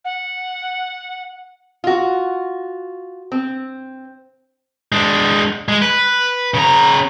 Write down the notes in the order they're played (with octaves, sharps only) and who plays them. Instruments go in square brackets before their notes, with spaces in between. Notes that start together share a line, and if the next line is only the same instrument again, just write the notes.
[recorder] F#5
[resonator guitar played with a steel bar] F4 F#4
C4
[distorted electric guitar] G#3 D4
G#3
B4
C#3 A#5